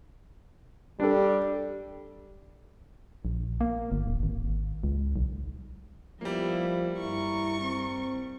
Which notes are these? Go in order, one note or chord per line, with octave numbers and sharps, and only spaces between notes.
G3 D4 A4
A#1
A#3
G1
D1
G#1
C#2
B1
F3 G3 A#3 B3 E4
G2 E4 A#5 C#6
C4